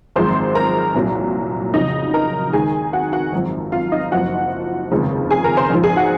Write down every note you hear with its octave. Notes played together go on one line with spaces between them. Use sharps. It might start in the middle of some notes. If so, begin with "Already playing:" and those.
G#1 F#2 F3 G#3 C5 C6
A#4 A#5
C2 A#2 F#3
F2 C#3 F#3 D#4 D#5
A#4 A#5
D#2 D#3 G#3 G#4 G#5
F#4 F#5
F#4 F#5
G#1 F#2 F3
F4 F5
D#4 D#5
F#1 F#2 F3 F#4 F#5
F1 D#2 C#3 F3 G#3
G#4 G#5
A#4 A#5
C5 C6
A#1 G#2 F3
G#4 G#5
F#4 F#5